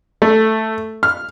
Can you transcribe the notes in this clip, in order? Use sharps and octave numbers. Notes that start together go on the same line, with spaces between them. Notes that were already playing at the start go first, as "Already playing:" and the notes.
A3
F6